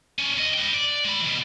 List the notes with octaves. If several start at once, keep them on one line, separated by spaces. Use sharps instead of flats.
C#4 D4
D#2 D#5
B4 G5
D5
G#3 B5
B2 E3